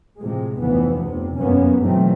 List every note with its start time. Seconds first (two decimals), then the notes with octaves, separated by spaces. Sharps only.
0.19 A2 C3 F3 G#3
0.59 F1 D2 E3 F3 B3
1.03 F1 C3
1.39 F1 F#2 A#3 B3 C#4
1.82 B2 D#3 E3 F#3 A3 C4